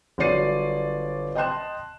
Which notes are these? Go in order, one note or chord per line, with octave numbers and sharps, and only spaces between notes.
G1 F#3 C#5 D5 C7 D#7
D#5 G5 A5 C6 F#6 E7